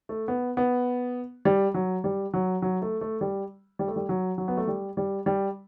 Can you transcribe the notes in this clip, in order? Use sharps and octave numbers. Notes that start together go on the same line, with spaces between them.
A3
B3
B3
G3
F#3
G3
F#3
F#3
A3
A3
G3
G3
A3
G3
F#3
F#3
B3
A3
G3
G3
G3